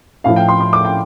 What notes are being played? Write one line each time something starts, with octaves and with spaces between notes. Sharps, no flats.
A2 F3 F5
G5
C6
C6
D6
G5